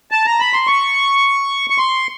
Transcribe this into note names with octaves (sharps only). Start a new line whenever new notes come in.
A5
A#5
B5
C6
C#6
C#6
C6